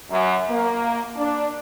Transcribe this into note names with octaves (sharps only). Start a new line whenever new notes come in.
F#2
A#3
D4